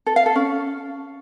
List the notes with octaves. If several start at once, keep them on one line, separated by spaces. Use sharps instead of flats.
A4
F5
A4
C#4